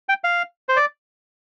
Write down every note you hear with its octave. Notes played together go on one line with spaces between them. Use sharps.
G5
F5
C5
D5